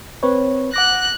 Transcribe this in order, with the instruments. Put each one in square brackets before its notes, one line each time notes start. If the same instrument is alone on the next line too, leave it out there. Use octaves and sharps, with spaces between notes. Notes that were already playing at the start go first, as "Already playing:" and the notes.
[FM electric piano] C4 B4 C#5
[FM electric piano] F#5 D6 A#6 [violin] F#6